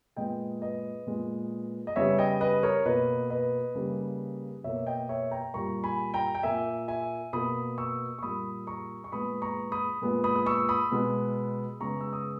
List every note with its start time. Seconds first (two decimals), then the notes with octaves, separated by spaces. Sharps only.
0.16 A#2 G#3 B3 D#5 G5
0.62 B4 D#5
1.07 A#2 G#3 B3
1.87 D#5
1.96 C#3 G3 B3 C#5 E5
2.18 D#5 G5
2.41 B4 D#5
2.63 A#4 C#5
2.85 B2 A#3 B4 D#5
3.30 B4 D#5
3.75 C#3 G3 A#3
4.64 B2 A#3 C#5 E5
4.87 D#5 G5
5.09 C#5 E5
5.31 G5 A#5
5.54 A#2 G3 A#3 A#5 C#6
5.84 G#5 B5
6.14 G5 A#5
6.35 G5
6.43 A#2 A#3 E5 G#5
6.88 E5 G#5
7.33 B2 A#3 B5 D#6
7.78 C#6 E6
8.18 C#6
8.22 A#2 G3 A#3 B5 D#6
8.67 A#5 C#6
9.04 C#6
9.12 A#2 G#3 B3 B5 D#6
9.42 A#5 C#6
9.72 B5 D#6
10.02 A#2 G#3 B3
10.24 B5 D#6
10.36 D#6
10.46 C#6 E6
10.69 B5 D#6
10.91 B2 G#3 B3
11.81 C#3 G#3 B3 A#5 C#6
12.01 E6
12.13 D#6